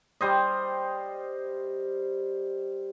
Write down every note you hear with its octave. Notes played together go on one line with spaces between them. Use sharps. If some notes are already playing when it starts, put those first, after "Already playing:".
G3 C5 D#5